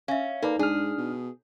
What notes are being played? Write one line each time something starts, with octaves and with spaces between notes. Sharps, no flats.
C#4 E5 F5
A#3 D#4 A4 B4 D5
G#2 D4 G#4 F6
B2